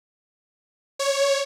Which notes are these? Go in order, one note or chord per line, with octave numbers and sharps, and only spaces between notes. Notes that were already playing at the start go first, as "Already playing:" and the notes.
C#5